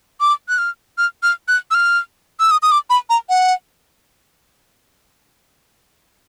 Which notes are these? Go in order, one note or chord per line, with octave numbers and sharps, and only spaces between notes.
D6
F#6
F6
F6
F6
F#6
E6
F6
E6
D#6
D#6
D6
B5
A#5
F#5